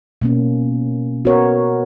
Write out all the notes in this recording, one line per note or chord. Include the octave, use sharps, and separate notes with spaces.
B2 A#3 C#4
B3 F#4 A#4 C#5